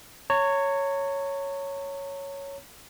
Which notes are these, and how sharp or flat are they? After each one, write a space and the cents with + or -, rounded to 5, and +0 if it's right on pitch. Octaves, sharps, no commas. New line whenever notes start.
C#5 +0 A#5 -40